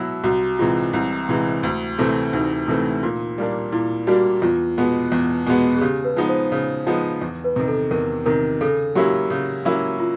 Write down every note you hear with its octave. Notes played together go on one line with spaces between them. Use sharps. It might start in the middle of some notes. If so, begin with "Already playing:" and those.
Already playing: B2 F#3 E4
C2 F#4
C3 E3 G#3 F4
C2 E4
C3 E3 G#3
D2
C3 E3 A3 C4
D2 D#4
C3 E3 A3 C4
A#2
G3 A#3 D4
A#2 E4
G3 A#3 D4 F#4
E2 F4
B2 G#3 B3
E2
B2 G#3 B3
G#4
C#3 G4
B4
F3 G#3 B3 D#4
C5
C#3
F3 G#3 B3 D#4
E2
B4
C3 D#3
A4
E2 A#4
C3 D#3 A#4
C#3 A4
F#3 A#3 C#4 E4 G4
C#3
F#3 A#3 C#4 E4
F4